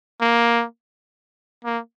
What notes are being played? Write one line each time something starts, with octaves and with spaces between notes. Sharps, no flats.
A#3
A#3